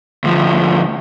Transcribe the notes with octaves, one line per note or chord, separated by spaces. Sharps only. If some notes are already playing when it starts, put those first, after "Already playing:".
D2 F3